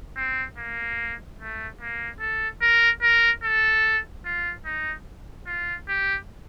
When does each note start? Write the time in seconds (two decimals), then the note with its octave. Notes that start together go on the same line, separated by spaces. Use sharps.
0.17 C4
0.57 A#3
1.39 A3
1.81 A#3
2.20 A4
2.61 A#4
3.02 A#4
3.43 A4
4.25 F4
4.65 D#4
5.46 F4
5.88 G4